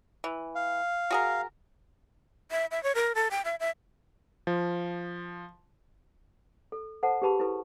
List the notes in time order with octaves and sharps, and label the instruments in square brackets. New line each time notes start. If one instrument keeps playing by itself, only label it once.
[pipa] E3
[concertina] F5
[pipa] F#4 G#4 A#4
[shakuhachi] E5
E5
C#5
A#4
A4
G5
E5
E5
[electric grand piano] F3
[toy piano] A4
A4 C5 F#5 A5
G4 G#4 B4 A5 B5
E4 A4 B4 C#6